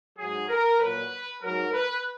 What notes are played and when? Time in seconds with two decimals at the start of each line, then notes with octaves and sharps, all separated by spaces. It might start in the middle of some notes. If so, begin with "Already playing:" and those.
0.17 G#2 F#3 G#4
0.49 A#4
0.79 A#2 F#3 B4
1.42 G#2 F#3 A#4
1.73 B4